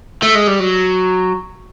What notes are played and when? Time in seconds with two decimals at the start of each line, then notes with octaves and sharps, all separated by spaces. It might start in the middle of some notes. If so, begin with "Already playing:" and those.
0.23 A3
0.35 G#3
0.47 G3
0.60 F#3